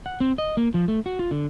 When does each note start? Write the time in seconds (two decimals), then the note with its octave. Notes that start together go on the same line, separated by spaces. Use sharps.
0.06 F#5
0.20 C4
0.38 D#5
0.57 A#3
0.74 F3
0.88 A3
1.06 F#4
1.19 F4
1.31 D3